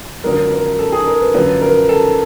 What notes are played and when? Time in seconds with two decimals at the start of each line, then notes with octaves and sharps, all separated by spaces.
0.24 F#2 D3 F3 G#3 A#4
0.51 A#4
0.79 A4
0.92 G#4
1.07 A#4
1.20 B4
1.34 F#2 D3 F3 B4
1.61 A#4
1.89 A4